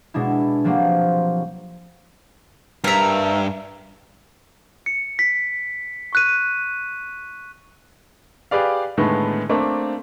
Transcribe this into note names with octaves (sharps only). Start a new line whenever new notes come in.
B2 G#3 D4 E4
F3 F#3 A#3 C4 G4
G2 A#4 E5
C#7
B6
C#6 F#6 D#7
G4 G#4 B4 D5 F5
A2 D3 D#3 G#3 A3 B3
A3 A#3 C4 D4